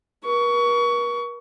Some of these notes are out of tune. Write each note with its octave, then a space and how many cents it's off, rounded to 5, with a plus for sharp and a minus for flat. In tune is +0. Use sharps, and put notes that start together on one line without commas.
A#4 +45 C#6 +25